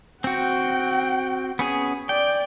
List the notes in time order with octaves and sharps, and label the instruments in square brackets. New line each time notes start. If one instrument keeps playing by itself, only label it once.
[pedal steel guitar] C4 F#4 [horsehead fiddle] F#5 G5
[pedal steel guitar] B3 C#4 G#4
[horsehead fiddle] D5 [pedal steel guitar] G5